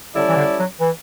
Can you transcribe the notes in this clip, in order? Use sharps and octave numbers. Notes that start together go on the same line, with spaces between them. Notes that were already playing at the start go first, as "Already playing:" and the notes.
D3 G3 C#4 E4 A4 D5
E3
D3
F#3
E3